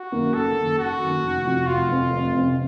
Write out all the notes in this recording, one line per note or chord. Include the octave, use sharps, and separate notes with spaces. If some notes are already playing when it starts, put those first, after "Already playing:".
Already playing: F#4
F#2 D#3 A#3
F#1 A4
F#2 D#3 A#3
F#1 F#4
F#2 D#3 A#3
F1
F2 C3 F3 C4
F1 F4
F2 C3 F3 C4
F1
F2 C3 F3 C4